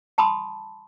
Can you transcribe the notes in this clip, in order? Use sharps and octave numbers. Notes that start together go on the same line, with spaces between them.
G5 A5 B5 C6 D#6